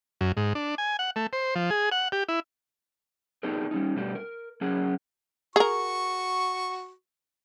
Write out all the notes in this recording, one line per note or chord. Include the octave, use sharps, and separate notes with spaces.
F#2
G#2
D4
G#5
F#5
A3
C5
F3
G#4
F#5
G4
E4
B3 D4 D#4 G4 G#4 A#4
G3 G#3 C#4 D#4
B2 G3 A3 D4 G4
A#4
F#3 C#4 G#4 A#4 F#5
F#4 G#4 A#4 C#6